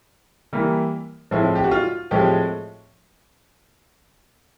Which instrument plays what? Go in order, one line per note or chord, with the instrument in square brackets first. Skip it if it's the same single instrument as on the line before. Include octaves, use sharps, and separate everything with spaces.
[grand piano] E3 G3 A#3
A2 F3 G#3 C4 E4
G4
F#4
F4
A2 F3 G#3 C4 G4